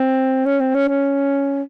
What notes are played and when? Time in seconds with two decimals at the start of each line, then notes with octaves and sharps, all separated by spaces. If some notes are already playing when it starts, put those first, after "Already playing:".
Already playing: C4
0.46 C#4
0.61 C4
0.75 C#4
0.88 C#4